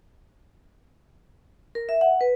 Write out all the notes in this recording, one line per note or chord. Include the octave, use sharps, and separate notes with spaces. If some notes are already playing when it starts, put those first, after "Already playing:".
A#4
E5
F#5
B4